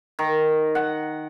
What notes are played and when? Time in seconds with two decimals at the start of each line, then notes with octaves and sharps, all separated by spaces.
0.19 D#3
0.75 F#5